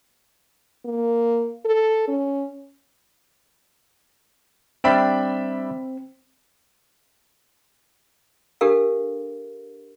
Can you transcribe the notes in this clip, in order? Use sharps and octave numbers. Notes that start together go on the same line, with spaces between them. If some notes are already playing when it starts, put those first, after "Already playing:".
A#3
A4
C#4
G3 C4 D4 D5 E5 G5 B5
D4 G4 A4 A#4 F5